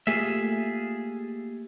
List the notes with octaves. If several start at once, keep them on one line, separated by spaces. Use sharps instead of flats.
A3 A#3 F4 G4 G#4 E5